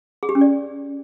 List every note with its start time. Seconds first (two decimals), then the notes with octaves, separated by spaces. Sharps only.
0.23 G#4
0.29 G4
0.35 C#4
0.41 D5